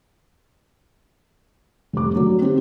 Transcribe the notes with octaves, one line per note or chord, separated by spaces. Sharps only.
F1 G3 D6
D3 F#3 A3
C4 D#4 G4